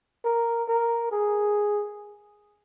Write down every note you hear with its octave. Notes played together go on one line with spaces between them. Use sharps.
A#4
A#4
G#4